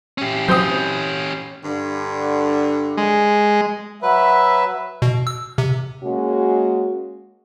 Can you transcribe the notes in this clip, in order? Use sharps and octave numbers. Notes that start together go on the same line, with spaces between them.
C#4 G4
F#3 C4 D#6 G6
G2 D3
G#3
F#3 B4 E5
B2
E6
C3
G#3 A#3 C#4 F#4